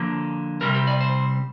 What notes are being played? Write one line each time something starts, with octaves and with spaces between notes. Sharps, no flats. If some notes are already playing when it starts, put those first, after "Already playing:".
Already playing: D3 F3 A#3
C3 D#3 G3 C4 A#4
G4
D5
C5